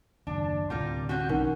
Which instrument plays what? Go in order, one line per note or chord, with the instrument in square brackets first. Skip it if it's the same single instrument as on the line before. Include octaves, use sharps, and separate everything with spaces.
[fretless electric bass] F#1 D#2 [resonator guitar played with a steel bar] D4
[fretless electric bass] D2 A2 C3 [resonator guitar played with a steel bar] G3 F4 A#4
[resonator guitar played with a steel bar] C4 C#4 F#4 [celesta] F#5
[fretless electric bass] B1 D#3 E3 [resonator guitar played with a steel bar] C#4 [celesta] D#4 A#4 F#5